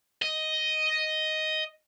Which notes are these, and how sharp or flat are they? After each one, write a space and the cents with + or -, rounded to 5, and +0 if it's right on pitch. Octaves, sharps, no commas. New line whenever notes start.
D#5 +5